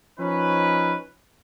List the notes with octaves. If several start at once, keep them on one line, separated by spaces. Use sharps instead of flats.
F3 C#4 D#4 B4